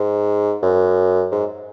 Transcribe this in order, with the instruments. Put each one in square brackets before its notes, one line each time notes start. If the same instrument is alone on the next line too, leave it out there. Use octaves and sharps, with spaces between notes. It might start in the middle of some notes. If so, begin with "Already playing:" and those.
Already playing: [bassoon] G#2
F#2
G#2